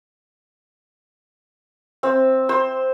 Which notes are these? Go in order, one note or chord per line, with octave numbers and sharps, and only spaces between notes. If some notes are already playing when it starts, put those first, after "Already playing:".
C4
C5